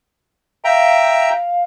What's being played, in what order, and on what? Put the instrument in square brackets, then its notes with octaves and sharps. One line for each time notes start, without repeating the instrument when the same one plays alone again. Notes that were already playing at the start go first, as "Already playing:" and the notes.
[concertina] E5 G5 A#5 [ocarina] F5